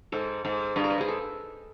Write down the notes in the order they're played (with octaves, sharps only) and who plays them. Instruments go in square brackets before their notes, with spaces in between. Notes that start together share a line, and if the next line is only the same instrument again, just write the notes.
[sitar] G#2 [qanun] A4
[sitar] G#2
[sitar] G2 [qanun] B4
[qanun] A#4
B4
[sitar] G#2 [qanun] G#4
[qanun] A4